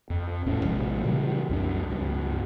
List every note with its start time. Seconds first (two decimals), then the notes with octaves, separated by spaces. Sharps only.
0.10 F2
0.46 D#1 A2 C#4
0.65 A#1 C3 F3 G#3
1.03 A#2 C#3 E3 G3
1.49 C2 F#2 D4
1.90 C#2 G2